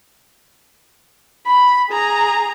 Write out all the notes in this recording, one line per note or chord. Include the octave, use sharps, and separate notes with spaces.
B5
G#4 A#5